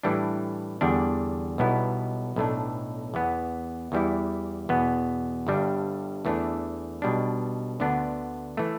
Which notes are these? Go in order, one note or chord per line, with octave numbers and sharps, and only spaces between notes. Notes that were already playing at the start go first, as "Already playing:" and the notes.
A2 E3 G3 D4
E2 D3 G3 D4
B1 B2 G3 B3 E4
B1 A2 A3 D4
E2 E3 B3
E2 E3 G3 E4
E2 B2 B3
G1 G2 G3 D4
E2 E3 A3 D4
B1 B2 G3 D4
D2 D3 B3 D4
E3 A3